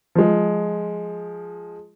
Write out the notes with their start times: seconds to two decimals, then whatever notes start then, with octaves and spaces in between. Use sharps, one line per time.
0.15 F3 G#3